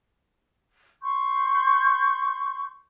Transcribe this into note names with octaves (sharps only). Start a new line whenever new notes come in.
C6 C#6 G6